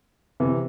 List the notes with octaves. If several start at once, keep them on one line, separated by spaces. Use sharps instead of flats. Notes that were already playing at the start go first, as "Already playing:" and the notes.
C3 E3